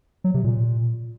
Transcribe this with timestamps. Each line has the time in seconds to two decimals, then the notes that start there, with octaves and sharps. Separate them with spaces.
0.24 F#3
0.34 C3
0.44 A#2